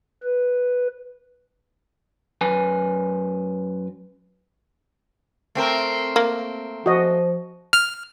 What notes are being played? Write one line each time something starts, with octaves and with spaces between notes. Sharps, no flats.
B4
F#2 B4 G#5
A3 C4 A#4
A#3
F3 F#4 D#5
F6